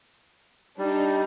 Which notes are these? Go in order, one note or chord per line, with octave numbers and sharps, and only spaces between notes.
G3 D4 D#4